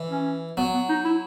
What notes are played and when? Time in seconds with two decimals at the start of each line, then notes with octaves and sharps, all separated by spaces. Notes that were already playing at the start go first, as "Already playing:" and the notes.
Already playing: E3
0.10 C#4
0.57 F#3 B3
0.74 B3
0.89 D#4
1.05 E4